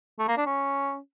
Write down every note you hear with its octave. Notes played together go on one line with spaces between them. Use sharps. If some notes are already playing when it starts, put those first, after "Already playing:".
A3
A#3
D4
C#4